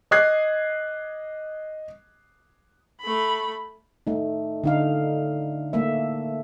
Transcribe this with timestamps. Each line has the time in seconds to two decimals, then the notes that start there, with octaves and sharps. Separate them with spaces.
0.11 D#5 D#6 F#6 G#6 C7
3.01 A3 B5
4.07 A3 D#4
4.64 D3 D#4 F5
5.73 A3 A#3 E5